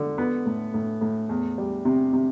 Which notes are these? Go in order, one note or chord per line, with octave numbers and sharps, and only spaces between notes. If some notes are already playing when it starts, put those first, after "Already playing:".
Already playing: D3
B3
A2
A2
A2
E2
G3
C3
C3